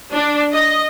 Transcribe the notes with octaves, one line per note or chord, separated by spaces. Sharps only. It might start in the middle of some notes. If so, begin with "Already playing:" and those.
D4
D#5